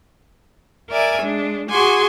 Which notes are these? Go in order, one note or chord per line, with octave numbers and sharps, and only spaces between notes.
A#4 D5 E5 G#5
G#3 D4
F#4 G#4 G#5 C6 D6